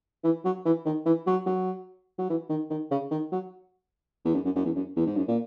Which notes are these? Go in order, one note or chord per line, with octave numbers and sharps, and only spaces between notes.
E3
F#3
E3
D#3
E3
F#3
F#3
F#3
E3
D#3
D#3
C#3
D#3
F#3
E2
F#2
F#2
F#2
E2
F#2
E2
G#2
F#2
A#2